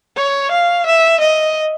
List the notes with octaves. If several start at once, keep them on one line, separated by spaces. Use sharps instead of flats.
C#5
F5
E5
D#5